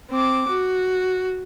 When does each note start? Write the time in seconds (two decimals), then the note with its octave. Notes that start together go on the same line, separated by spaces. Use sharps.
0.11 C4 D6
0.49 F#4